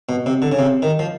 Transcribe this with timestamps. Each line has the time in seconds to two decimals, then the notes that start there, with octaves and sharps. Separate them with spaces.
0.09 B2
0.26 C3
0.42 D3
0.52 C#3
0.59 C3
0.82 D#3
0.99 F3